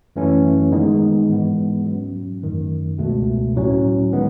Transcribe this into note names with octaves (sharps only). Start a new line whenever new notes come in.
F#2 E3 A3 C#4
D#3 G#3 B3 D#4
G#2 E3 G#3 B3
G#2 F#3 C#4
F#2 D#3 A3
C#2 B2 A3
A2 F#3 C#4
D#3 G#3 B3